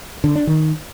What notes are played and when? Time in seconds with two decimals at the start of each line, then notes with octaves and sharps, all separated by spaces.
0.24 D3
0.36 D4
0.47 D#3